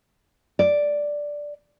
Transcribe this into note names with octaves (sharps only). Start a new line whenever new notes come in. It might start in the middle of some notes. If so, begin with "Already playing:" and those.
D5